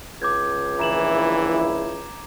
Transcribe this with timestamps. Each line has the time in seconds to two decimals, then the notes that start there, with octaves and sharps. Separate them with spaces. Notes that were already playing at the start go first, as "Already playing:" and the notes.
0.22 C#2 D6 G6 G#6
0.80 A#1 E3 E4 A#5 E7 F#7